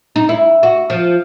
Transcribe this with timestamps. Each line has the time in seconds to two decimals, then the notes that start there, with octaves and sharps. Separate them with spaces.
0.16 D#4
0.29 E4
0.63 F#4
0.90 F3